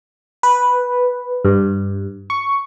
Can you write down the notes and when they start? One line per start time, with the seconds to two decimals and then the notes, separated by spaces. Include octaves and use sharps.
0.43 B4
1.45 G2
2.30 C#6